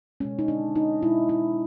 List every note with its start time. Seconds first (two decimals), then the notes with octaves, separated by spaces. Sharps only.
0.20 B2 G#3 C#4
0.39 D#4
0.48 D4
0.76 D#4
1.02 B2 G#3 E4
1.29 E4